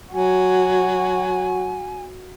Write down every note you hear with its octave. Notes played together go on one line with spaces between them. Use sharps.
F#3 F#4 G#5